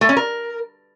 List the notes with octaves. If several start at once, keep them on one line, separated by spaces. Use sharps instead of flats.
A3
C#4
A#4